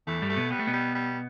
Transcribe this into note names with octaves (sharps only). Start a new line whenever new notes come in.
E2 E3 A3
G2 G3
A3
B2 B3
G3 B3
A3
B2 B3
G3
G3